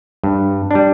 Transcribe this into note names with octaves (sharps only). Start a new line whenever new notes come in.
G2
G3 D4